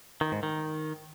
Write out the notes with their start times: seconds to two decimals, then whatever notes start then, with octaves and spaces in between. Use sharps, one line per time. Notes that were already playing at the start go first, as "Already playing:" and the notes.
0.21 D#3
0.32 G#2
0.43 D#3